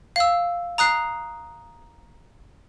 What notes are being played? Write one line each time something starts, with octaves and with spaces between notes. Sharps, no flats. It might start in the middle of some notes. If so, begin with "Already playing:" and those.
F5 E6
A#5 D#6 F#6 C7